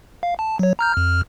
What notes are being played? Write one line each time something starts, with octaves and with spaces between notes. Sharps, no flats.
F5
A5
F#3 C#5
A#5 F6 G6
F2 F6